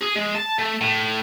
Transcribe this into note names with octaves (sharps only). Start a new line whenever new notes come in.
G#4
G#3
A5
A3
A2